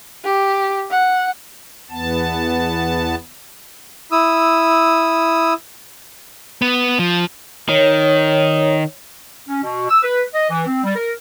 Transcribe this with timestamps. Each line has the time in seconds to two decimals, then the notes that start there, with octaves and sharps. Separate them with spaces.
0.25 G4
0.91 F#5
1.90 E2 B3 A5
4.12 E4 D#6 E6
6.62 B3
6.99 F3
7.69 D#3 C#5
9.48 C#4
9.63 B2
9.89 E6
10.03 B4
10.34 D#5
10.49 E3
10.66 C4
10.84 G3
10.96 A#4